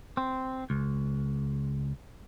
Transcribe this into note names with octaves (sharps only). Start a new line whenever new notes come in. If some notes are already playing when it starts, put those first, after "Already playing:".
C4
C#2